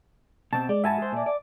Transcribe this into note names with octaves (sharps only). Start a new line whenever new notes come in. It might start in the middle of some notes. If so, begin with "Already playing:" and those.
B2 C4 A5
G#3 D5
G#2 F#4 B4 E5 G#5 A5
G#3 C5
A#2 D5
D5